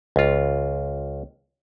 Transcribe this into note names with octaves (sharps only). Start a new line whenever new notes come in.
C#2 F4